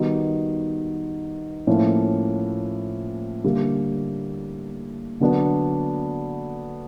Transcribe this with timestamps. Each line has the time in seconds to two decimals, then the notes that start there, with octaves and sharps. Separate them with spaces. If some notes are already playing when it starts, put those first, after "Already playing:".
Already playing: D#3 G3 B3 D#4 F#4
1.67 A2 F3 A#3 C#4
3.44 D3 G3 A#3
5.20 D3 F#3 B3 D4